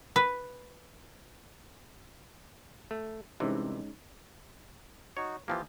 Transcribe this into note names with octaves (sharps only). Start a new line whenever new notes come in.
B4
A3
C2 C3 E3 G#3 C#4 D#4
D#4 F#4 C#5
E3 F3 A#3 F4 G4